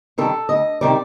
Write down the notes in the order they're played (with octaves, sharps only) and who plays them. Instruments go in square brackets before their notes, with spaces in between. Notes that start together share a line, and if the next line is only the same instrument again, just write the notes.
[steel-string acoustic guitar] C3 D#3 G3 A4
D2 D#5
C3 D#3 G3 D5